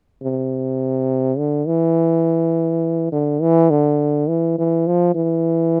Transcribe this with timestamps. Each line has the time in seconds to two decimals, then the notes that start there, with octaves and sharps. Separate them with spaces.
0.23 C3
1.38 D3
1.67 E3
3.12 D3
3.42 E3
3.70 D3
4.29 E3
4.58 E3
4.87 F3
5.15 E3